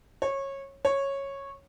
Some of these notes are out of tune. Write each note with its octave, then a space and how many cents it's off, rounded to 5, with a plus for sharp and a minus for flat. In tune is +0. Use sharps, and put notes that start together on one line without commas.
C#5 -20
C#5 -10